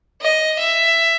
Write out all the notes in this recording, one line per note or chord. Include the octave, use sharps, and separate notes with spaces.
D#5
E5